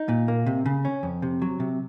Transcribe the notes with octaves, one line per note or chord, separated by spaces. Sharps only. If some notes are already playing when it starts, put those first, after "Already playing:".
Already playing: D#4
A#2
A#3
C3
C#3
C#4
F2
C3
F#3
C3